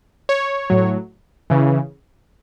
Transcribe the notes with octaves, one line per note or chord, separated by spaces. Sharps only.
C#5
A2 F#3
C#3 E3